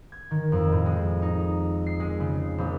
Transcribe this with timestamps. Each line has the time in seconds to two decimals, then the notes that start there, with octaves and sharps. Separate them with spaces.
0.12 G#6
0.31 D#3
0.52 F2
0.72 A2
0.86 G#3
1.22 D#4
1.87 C7
2.00 G#3
2.20 C#3
2.58 A#1